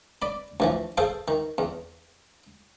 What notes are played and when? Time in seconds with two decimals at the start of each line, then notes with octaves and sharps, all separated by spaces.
0.22 D5 B5
0.60 D2 E3 F3
0.98 G#4 A4 C5 F5
1.28 D#3
1.58 E2